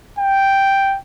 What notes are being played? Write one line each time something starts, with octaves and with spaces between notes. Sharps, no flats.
G5